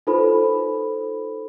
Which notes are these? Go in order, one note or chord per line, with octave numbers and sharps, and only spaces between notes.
D#4 F4 A4 B4 C5 B5